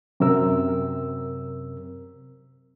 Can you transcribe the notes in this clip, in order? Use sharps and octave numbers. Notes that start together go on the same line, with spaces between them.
F#2 C3 C4 A#4 E6